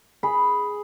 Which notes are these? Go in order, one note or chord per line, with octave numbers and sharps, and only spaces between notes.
G#4 B5